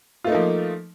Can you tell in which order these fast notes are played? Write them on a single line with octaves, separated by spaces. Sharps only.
F4 A3 D#4 A#3 F3